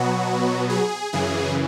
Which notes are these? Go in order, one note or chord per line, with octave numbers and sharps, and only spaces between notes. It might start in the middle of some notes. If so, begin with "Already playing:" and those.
Already playing: B2 F#3 B3 F#4
G#4
F#2 C#3 E3 G#4